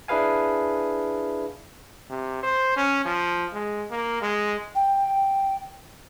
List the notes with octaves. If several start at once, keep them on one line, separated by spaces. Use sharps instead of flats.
D4 E4 G#4 B4 F5 G#5
C3
C5
C#4
F3
G#3
A#3
G#3
G5